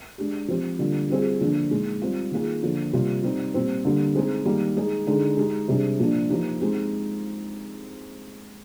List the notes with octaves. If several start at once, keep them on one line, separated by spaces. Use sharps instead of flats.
G#3 D4 G4
F3 C4 G4
D3 G3 A#3 F4
G3 C4 F4 G#4
D3 F3 A#3 D4
A#2 G#3 D#4
G3 C4 F4
D#3 A#3 F4 G#4
D3 F3 A#3
C3 G3 A#3 F4
G3 C4 D#4
A#2 G3 C4
D3 G3 A#3
G#3 C4 D#4 G#4
D#3 G3 A#3
G#3 D#4 G#4
D3 G#3 D#4 G#4
G#3 D#4 G4
C3 G3 D4 G#4
A#2 F3 A#3 D4
F3 A#3 D#4 G4
G#3 C4 D#4 G4